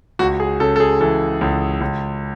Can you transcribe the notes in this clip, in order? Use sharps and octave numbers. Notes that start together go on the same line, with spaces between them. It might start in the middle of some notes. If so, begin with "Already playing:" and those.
C#2 F#4
G#4
C#3 A4
A4
G#4
E3 A4
C#2
C#2